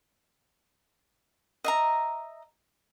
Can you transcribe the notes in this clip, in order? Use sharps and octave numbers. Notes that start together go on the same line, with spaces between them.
D#5 E5 A#5